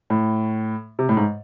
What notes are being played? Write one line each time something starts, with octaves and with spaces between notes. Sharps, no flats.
A2
C3
A2
G#2